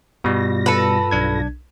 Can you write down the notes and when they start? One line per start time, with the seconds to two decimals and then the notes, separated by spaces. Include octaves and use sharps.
0.24 G2 B2 G3 F4 A#6
0.66 A4 B4
1.11 B1 D4 G#6